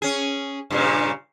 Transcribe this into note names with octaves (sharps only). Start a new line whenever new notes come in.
C#4 G#4
G2 A#2 C#3